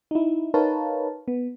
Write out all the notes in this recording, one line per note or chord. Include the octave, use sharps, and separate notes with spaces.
D#4 E4
D#4 A#4 B4 C#5 F5 A5
B3